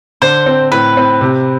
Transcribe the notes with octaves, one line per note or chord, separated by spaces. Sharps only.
D3 C5
C4
A2 B4
C4
C3